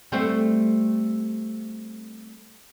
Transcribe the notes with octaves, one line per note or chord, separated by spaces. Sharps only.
G3 A3 C4